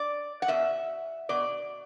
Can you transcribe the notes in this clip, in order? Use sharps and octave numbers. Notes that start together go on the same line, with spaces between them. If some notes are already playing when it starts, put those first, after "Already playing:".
Already playing: D5
F#5
B2 E5
B2 D5